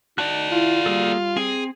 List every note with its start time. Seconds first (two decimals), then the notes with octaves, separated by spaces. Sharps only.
0.18 D#4 F#4 D5 A5 F#6
0.52 E4 F4
0.86 G3 A#3 G#4 A4
1.36 C4 G#4